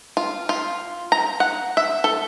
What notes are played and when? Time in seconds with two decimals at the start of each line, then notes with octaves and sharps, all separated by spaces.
0.17 F4
0.49 F4
1.12 A#5
1.40 F#5
1.77 E5
2.04 A4